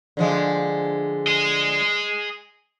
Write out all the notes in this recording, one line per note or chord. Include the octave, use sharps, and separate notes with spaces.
D3 F3 G#3
G#4 D#5